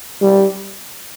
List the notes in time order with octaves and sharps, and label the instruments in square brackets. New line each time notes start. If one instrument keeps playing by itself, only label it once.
[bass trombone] G3